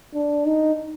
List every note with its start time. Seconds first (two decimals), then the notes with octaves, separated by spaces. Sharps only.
0.14 D4
0.46 D#4